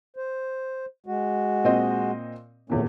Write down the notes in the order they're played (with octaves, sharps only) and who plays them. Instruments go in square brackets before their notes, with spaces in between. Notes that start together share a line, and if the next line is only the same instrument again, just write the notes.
[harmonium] C5
G#3 F#4
[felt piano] A#2 C4 D#5
[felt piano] D#1 E2 A#2 [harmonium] A3 C#4